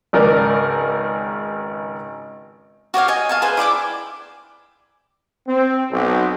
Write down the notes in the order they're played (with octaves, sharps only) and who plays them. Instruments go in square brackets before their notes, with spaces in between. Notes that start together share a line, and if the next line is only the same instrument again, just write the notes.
[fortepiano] G#1 C#2 A#4 D5
[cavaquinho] F#4 G4 C#5 F5
D#5 G5 G#5
F5 A5 C#6
G#4 B4 C5 G#5
E4 D5 G5 D6
[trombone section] C4
B1